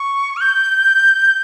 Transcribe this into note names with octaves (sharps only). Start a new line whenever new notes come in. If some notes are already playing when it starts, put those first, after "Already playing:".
Already playing: C#6
F6
G6